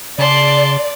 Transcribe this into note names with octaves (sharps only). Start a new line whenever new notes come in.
C#3 D5 A5 C6